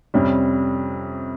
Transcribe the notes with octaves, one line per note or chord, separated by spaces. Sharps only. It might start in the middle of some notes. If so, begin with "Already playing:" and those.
F2 C3 G3 C#4